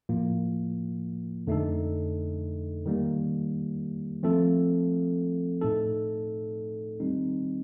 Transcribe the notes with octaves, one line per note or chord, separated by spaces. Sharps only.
A2 F3 A#3 F4
F2 D3 A3 D#4 A4
D#3 G3 A#3
F3 A3 C4 F4 A4
A2 A3 D#4 A4
D#3 G3 C4 D#4